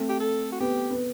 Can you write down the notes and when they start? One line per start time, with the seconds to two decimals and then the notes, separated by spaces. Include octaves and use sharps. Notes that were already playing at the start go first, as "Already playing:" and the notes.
Already playing: A3 C4
0.09 G4
0.20 A4
0.52 F#4
0.60 B3 G4
0.91 B3